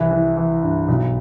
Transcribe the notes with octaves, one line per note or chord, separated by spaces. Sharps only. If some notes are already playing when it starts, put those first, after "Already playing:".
Already playing: C2 E3 E4
E3
E3
G2
B1